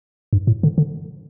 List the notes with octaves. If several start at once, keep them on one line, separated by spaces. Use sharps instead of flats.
G2
A2
D3
D3